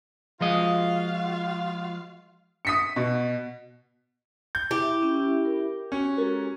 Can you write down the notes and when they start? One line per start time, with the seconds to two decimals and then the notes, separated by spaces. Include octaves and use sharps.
0.41 F3 G#3 F4 F#4 D#5 F5
2.65 D#6 B6 C#7
2.96 B2
4.55 G6
4.71 E4 G4
5.02 C#4
5.45 A#4
5.92 C#4 F#4
6.17 G#3 F#4 A4 A#4